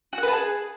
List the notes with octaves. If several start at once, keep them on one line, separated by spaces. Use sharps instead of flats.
F#4
F#5
B4
A5
G#4